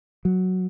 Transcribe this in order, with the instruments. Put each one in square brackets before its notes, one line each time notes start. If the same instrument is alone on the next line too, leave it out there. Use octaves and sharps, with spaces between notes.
[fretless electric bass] F#3